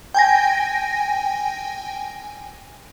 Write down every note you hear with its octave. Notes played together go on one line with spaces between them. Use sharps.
G5 G#5 A#6